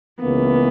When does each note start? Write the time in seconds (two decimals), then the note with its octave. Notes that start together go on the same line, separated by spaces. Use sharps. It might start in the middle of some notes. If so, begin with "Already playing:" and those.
0.21 C#2 C#3 E3 A#3 B3